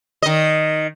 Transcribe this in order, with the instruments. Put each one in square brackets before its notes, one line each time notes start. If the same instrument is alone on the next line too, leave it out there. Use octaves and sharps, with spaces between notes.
[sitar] D#3 D#5